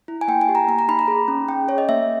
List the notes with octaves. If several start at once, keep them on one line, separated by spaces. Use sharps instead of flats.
E4
G#5
A#3 G5
G#5
G4
A#5
A#3 A#5
A#5
D#4 B5
A#5
G#4
C#4
C#4 G5
G#4 C#5
D#5
A#3 E5